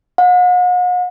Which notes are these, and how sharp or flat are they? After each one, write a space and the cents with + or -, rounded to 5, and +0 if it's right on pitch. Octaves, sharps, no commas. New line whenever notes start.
F#5 -45